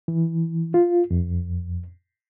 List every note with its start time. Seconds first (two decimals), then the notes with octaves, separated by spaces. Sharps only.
0.08 E3
0.74 F4
1.11 F2